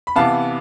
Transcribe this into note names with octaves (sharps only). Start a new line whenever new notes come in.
B5
C3 E3 B3 F5 A5